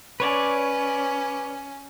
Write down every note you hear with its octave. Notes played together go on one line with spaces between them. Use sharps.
C#4 B4 C#5 D5